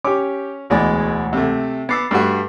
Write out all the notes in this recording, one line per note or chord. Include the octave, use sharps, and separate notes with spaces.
C#4 G4 D6
E1 D2 B2 E3 G#3 D5
C3 A3
B3 D6 E6 A6 C7
G2 G3 A3 F#4